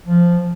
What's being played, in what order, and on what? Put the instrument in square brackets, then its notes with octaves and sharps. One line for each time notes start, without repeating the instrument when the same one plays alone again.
[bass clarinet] F3